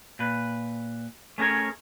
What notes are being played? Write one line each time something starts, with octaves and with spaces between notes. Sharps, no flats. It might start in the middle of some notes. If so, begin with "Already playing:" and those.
A#2 B4
A3 C#4 G#4 A#4 C#5